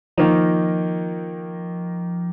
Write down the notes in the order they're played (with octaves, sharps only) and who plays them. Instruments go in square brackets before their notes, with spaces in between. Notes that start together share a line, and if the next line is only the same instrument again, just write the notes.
[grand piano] D#3 A#3 D#4 [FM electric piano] F3